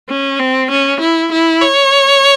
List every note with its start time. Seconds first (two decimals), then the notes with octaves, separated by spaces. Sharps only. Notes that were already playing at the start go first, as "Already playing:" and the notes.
0.09 C#4
0.39 C4
0.70 C#4
1.00 E4
1.32 E4
1.61 C#5